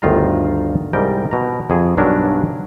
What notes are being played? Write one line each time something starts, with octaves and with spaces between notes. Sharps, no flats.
G1 D2 D#3 F4 F5 A#5
C2 G#2 G3 A#4 G5
B2 A#5
F2 G#4
B1 G2 F#3 C#4 D4 A#4